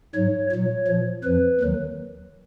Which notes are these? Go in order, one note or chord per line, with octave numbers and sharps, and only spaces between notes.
G#2 F#3 C#5
A#2 F#3 C#5
A#2 F3
F2 F3 B4
D#2 D#3 F#3